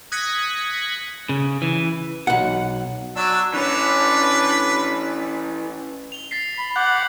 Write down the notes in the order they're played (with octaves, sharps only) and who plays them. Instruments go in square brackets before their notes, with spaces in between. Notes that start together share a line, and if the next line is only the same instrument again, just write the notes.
[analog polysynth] D#6 F#6 G#6 A#6 B6 C#7
[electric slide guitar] C#3
E3
[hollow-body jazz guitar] B1 F#5
[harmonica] F#3 D4 E6
[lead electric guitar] E3 C#4 [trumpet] D4 [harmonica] B4
[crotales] F7 G7
A6 B6 C7
[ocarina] B5
[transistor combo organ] F#5 [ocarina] D6 [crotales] G6 F#7